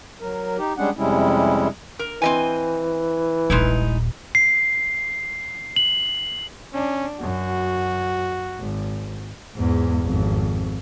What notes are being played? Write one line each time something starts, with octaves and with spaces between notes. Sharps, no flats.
F#3 A#4
D#4 G4
G3 G#3 C#4 D4 F#5
F2 C3 G3 G#3 C#4 E4
A#4
E3 C4 D#5 G#5
D#1 A#1 G#3 D#4 E4
C7
F#7
C#4 D4
F#2 F#4
G#1
E2 G#2
G#1 F2